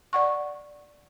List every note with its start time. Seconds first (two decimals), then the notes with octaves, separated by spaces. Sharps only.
0.13 D5 F#5 C#6